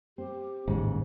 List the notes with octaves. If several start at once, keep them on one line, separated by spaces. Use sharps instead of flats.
C4 G4
A1 D#2 G#2 C#3